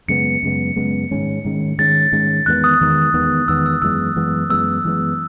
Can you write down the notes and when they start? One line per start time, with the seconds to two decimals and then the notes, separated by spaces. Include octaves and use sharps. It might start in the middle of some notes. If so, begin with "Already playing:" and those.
0.08 F#2 C#3 G#3 B3 C#7
0.43 F#2 C#3 G#3 B3
0.76 F#2 C#3 G#3 B3
1.11 G#2 D#3 G#3 C#4
1.44 G#2 D#3 G#3 C#4
1.78 G#2 D#3 G#3 C#4 A6
2.12 G#2 D#3 G#3 C#4
2.46 E2 D#3 G#3 B3 F#6
2.64 D#6
2.80 E2 D#3 G#3 B3
3.14 E2 D#3 G#3 B3
3.48 E2 D#3 G#3 B3 E6
3.66 E6
3.82 F#2 E3 G#3 B3 E6
4.16 F#2 E3 G#3 B3
4.50 F#2 E3 G#3 B3 E6
4.84 F#2 E3 G#3 B3